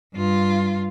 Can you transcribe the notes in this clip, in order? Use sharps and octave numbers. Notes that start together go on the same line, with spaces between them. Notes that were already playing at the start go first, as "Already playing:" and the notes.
G2 F4